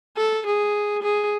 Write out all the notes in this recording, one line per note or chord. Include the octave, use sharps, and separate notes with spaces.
A4
G#4
G#4